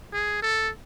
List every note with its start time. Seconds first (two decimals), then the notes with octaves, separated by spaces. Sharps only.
0.13 G#4
0.42 A4